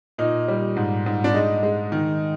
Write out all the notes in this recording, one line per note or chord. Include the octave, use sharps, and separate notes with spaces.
A#2 D#4
G3
G#2
G#2
D4
G#3 D#4
G#3
D#3